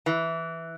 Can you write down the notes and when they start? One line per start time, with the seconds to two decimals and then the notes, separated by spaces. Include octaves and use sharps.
0.06 E3